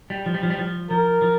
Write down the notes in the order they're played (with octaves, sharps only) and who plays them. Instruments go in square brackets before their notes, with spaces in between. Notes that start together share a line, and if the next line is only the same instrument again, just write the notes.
[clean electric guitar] G3
F3
G3
F3
G3
F3
[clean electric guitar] F3 [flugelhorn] A#4
[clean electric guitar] F3